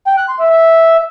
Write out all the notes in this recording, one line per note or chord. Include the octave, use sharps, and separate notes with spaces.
G5
F#6
C6
E5
E5